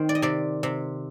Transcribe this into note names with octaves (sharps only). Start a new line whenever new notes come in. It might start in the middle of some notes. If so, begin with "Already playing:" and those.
Already playing: D#3 C4 C5
D5
D#5
C3 D5
C3